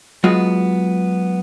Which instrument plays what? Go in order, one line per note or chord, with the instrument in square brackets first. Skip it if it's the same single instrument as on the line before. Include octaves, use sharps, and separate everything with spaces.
[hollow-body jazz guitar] F#3 G#3 B3 F4 F#4